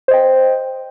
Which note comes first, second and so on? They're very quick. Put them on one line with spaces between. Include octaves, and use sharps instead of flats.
C5 D#5 G5